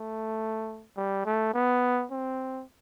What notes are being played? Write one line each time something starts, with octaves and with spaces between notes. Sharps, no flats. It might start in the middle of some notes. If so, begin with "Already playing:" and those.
Already playing: A3
G3
A3
B3
C4